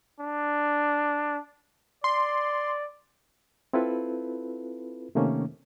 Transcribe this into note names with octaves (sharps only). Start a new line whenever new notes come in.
D4
D5 C6
C4 E4 F4 A4 B4
C3 D#3 A3 A#3 C#4